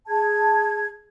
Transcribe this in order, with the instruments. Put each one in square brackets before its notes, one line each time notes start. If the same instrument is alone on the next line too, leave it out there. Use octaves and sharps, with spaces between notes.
[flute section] G#4 A5 G#6